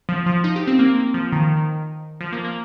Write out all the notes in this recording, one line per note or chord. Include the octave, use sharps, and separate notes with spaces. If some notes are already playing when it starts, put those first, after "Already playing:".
F3
F3
D#4
G4
C4
A#3
F3
D#3
F3
A#3
A#3